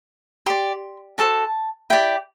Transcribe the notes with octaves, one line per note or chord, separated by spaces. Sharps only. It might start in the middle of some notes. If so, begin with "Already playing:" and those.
G4 D5 C6
F#4 A4 C5 A5
E4 G4 D5 G5